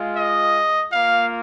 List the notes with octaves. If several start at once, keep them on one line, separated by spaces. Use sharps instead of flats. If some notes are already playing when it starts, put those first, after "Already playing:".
Already playing: G#3 F4
D#5
A#3 F4 F5